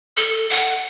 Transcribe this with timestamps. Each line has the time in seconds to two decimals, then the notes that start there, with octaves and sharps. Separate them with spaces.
0.17 A4
0.50 F#5